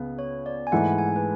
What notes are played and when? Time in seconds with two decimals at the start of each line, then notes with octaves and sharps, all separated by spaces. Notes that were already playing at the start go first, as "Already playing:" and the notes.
Already playing: C#2 C#3 B3
0.19 C#5
0.46 D5
0.67 G#5
0.72 G#2 E3 A3 E4 F#5
0.98 G#5
1.16 B4